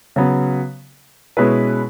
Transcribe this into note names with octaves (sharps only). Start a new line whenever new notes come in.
C#3 F#3 B3
B2 G#3 C#4 E4 B4